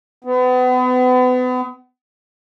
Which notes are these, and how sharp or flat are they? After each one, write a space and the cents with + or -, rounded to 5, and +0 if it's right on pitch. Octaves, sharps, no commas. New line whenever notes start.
B3 +35